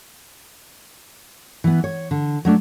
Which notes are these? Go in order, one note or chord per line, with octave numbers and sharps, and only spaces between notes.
E3 B3
C#5
D3
F#3 A3 D4